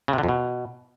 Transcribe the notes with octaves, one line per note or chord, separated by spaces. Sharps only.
C#3
C3
D3
F2
B2